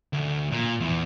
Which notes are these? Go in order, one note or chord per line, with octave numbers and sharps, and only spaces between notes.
D2
A#2
E2